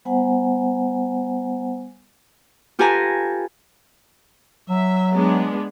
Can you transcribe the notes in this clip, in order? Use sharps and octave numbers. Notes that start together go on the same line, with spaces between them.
G3 B3 C5 F#5 G#5 A#5
F4 G4 A4 B4 G#5 A#5
F#3 E5
G#3 B3 D4